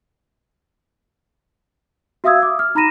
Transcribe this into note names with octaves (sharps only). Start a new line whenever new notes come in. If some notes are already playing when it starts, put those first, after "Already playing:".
F#4 E5 F5 D#6 E6 G#6
D6
F6
D#4 A#5 B5 A#6 D#7 E7